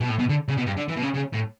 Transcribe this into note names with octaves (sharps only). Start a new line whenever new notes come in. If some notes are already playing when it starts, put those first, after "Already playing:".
B2
A2
B2
D3
C#3
B2
G2
D3
E3
B2
C#3
C#3
A2